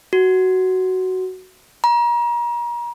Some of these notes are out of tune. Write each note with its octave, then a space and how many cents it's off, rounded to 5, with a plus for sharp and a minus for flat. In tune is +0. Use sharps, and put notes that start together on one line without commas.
F#4 +10
A#5 +35